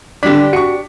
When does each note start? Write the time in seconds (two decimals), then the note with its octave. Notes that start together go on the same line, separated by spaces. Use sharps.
0.23 D3 G3 D4 G4 D5 B6
0.53 F#4 C#6 C#7